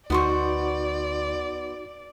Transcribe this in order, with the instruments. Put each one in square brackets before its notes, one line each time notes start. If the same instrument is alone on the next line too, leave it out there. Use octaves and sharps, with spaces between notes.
[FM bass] D2 [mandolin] B3 C5 C#6 [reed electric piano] D#4 F#4 [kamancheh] D5